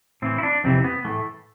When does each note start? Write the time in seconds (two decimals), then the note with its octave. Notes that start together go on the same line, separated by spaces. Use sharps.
0.22 A2 E3 C4
0.38 E4
0.43 D4
0.64 F2 C3 E3 C4
0.84 B3
1.05 A2 E3 A3